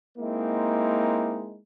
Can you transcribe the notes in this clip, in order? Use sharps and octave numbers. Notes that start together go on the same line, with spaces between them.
G#3 A#3 C4 D#4 E4